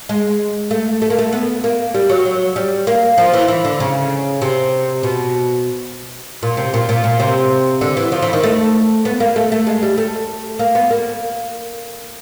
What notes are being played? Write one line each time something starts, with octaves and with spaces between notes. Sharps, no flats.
G#3
A3
A3
A#3
A3
B3
A#3
G3
F#3
F#3
G3
A#3
F3
E3
E3
D3
C#3
C3
B2
A#2
C3
A#2
A#2
A#2
C3
D3
E3
F3
E3
D#3
A3
B3
A#3
A3
A3
G#3
G3
A3
A#3
B3
A#3